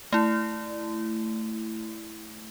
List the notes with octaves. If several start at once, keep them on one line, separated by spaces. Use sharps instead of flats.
A3 E4